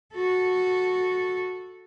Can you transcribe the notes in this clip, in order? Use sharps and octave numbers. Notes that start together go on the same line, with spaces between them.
F#4 A4